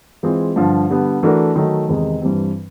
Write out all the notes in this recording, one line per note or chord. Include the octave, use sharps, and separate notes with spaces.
E3 G#3 C4 F4 G#4
G2 D3 F3
D3 G3 B3
E3 A3 D4 F#4 A#4
D#3 F#3 A3
E2 C3 D#3 G#3
G2 E3 G3 C4